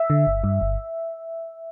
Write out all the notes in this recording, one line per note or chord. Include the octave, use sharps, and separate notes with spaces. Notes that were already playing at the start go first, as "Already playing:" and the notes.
Already playing: E5
D3
G1
G2
G1